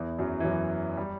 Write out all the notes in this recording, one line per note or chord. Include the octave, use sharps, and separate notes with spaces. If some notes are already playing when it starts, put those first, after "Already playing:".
Already playing: E2 E3
F#2 F#3
E3
F#2 F#3
G3